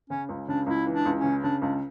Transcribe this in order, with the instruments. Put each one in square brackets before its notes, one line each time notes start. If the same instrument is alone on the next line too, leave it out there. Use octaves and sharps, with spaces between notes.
[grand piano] C#3 [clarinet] C#4
[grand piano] C#2
[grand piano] C#3 [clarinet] D4
[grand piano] C#2 [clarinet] E4
[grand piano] E3
[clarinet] D4
[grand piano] C#2
[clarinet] C#4
[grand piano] C#3
[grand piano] C#3 [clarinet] D4
[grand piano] C#2 [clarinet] D4